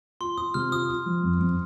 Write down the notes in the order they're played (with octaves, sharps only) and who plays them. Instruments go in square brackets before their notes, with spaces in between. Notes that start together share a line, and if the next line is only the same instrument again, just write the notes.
[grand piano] F4 [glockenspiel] C6
[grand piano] F4 [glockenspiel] D#6
[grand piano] C3 [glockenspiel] F6
[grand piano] F4 [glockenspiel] D#6
[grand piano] F4
F3
F2
F2